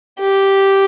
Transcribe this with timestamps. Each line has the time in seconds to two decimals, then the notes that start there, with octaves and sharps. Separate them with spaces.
0.21 G4